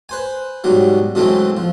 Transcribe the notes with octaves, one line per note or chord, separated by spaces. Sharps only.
B4 C5 G#5
G#2 B2 F#3 G3
F#2 B2 E3 G#3 A3 C4
F3